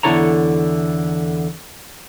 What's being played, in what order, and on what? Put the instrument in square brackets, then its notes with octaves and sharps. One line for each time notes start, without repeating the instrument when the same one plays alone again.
[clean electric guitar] E2 D3 E4 A4 C#5 A#5